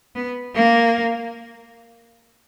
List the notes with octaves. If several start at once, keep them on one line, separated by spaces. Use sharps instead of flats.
B3
A#3